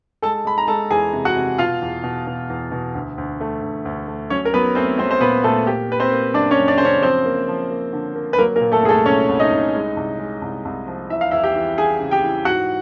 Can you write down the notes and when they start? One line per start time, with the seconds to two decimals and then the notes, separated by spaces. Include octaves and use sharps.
0.22 G#3 A4 A5
0.45 G#3 B5
0.58 A#5
0.68 G#3 A4 A5
0.90 E2 G#4 G#5
1.13 C3
1.25 F#4 F#5
1.36 C3
1.58 B2 F4 F5
1.82 E2
2.03 B2
2.27 B2
2.50 E2
2.72 B2
2.95 D2
3.18 D2
3.41 A3
3.62 D2
3.85 D2
4.07 A3
4.30 F#3 C#4 C#5
4.45 A#4
4.53 F#3 B3 B4
4.75 A3 C4 C5
4.98 F#3 C4 C5
5.11 C5
5.21 A#2 B3 B4
5.44 A#2 A3 A4
5.66 A#3 G4
5.89 A#3 B4
6.00 C4 C5
6.12 A#3
6.34 F#2 D4 D5
6.51 C#4 C#5
6.58 F#2
6.68 D4 D5
6.78 C#3 C5
6.85 C#4 C#5
7.02 F3 C4 C5
7.25 A#3
7.48 F3
7.70 A#3
7.93 D3
8.15 A#3
8.33 B4
8.38 F#3 A#3 A#4
8.56 A#3 A#4
8.61 A#2
8.72 A3 A4
8.83 C2 G#4
8.89 A3 A4
9.06 C2 C#4 C#5
9.29 C2
9.40 D#4 D#5
9.52 C2
9.74 G#3
9.97 C2
10.19 G#3
10.42 C2
10.65 C2
10.87 F3
11.10 E3 E5
11.21 F5
11.31 E2 E4 E5
11.43 G4 G5
11.56 E3
11.78 E3 G#4 G#5
12.00 C#3
12.11 G4 G5
12.24 E3
12.45 G#2 F#4 F#5